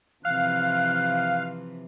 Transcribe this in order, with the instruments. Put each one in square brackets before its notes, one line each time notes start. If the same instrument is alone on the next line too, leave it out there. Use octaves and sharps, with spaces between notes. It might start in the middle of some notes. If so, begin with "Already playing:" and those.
[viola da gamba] C3 E3 F3 [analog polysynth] F5 [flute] F#6